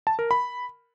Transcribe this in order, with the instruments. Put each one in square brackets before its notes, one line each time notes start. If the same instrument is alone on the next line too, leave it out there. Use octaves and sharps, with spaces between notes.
[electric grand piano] A5
A#4
B5